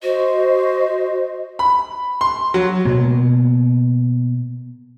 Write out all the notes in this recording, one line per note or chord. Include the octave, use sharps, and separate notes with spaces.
F#4 C5 D#5
B5
C6
F#3
B2 A#3